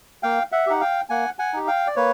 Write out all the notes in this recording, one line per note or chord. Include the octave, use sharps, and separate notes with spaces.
A#3 F5 G5
E5 F#5
D#4 G4 F#5
F5 G5
A#3 F#5 G#5
F#5 G#5
D#4 G4
F5 G5
D5
A#3 B4 C#5